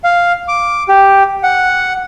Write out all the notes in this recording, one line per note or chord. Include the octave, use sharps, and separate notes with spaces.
F5
D6
G4
F#5